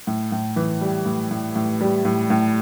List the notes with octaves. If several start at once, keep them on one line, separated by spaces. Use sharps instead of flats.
A2
A2
E3
G3
A2
A2
A2
G3
A2
A2